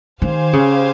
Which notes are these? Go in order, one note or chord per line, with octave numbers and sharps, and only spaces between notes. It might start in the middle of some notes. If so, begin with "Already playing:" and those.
D#3 G4 C5 F5 G#5
C#3